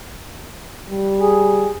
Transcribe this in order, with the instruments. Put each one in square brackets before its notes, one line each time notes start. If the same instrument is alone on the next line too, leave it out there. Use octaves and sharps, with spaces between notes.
[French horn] G3
[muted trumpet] G#4